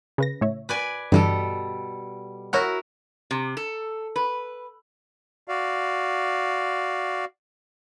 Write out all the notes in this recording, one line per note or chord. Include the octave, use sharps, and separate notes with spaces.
C#3 B4 A#6
A2 C#5 E5
B4 D5 G#5
G2 B2 D3 E3 G3 A4
E4 F#4 A#4 C#5 F#5
C3
A4
B4
F#4 D5 F5